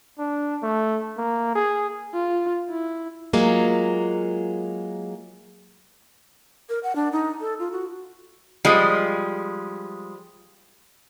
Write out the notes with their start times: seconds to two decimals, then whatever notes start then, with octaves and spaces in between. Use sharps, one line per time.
0.19 D4
0.63 A3
1.18 A#3
1.55 G#4
2.14 F4
2.69 E4
3.33 F#3 G#3 A#3 F4
6.69 A#4
6.83 F#5
6.95 D4
7.12 D#4
7.41 A4
7.59 F4
7.72 F#4
8.65 F3 G3 G#3